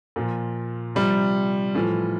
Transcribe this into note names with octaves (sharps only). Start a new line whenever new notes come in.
A#2 F3
C3 F3 G3
A2 E3 F3